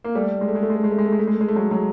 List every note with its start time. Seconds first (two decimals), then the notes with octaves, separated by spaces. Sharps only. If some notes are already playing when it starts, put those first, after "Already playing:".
0.04 A#3
0.15 G3 A3
0.41 G#3
0.48 A3
0.55 G#3
0.63 A3
0.70 G#3
0.76 A3
0.84 G#3
0.91 A3
0.98 G#3
1.06 A3
1.12 G#3
1.19 A3
1.27 G#3
1.34 A3
1.41 G#3
1.48 A3
1.56 F#3 G#3
1.71 F#3 G#3